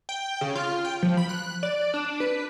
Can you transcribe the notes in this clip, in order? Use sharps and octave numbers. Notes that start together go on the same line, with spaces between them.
G5
C#3
F4
G5
F3
B5
F#6
D5
D4
B4